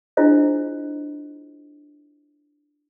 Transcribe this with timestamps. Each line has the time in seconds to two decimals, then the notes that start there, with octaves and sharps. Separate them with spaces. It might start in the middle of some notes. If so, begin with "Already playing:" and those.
0.17 D4 E4 F4 G#4 C5 D#5